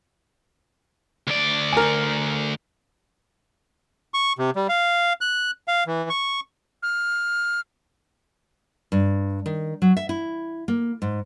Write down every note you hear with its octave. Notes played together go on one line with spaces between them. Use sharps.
D2 D5
A#4 G#5
C#6
C3
G3
F5
F#6
F5
E3
C#6
F6
G2
D#3
F#3
E5
E4
A#3
G#2